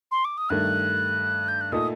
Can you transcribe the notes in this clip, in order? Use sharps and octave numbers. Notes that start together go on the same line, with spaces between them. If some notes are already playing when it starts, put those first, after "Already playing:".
C6
D6
D#6
G2 D#3 A3 F#6
G6
F#6
A#2 A3 D#4 A4 D#6